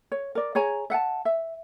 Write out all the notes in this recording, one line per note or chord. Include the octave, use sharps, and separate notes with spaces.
C#5
A#4 D5
G#4 C#5 G#5 A#5
E5 F#5 G#5 A5
E5